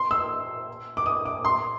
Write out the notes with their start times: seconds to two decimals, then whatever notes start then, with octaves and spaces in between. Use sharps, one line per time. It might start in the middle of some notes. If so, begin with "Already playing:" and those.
Already playing: C6
0.11 E6
0.97 D6
1.06 D#6
1.26 D6
1.45 C6